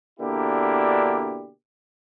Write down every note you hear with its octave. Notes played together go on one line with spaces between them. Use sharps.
B2 D3 A#3 D4 E4 G4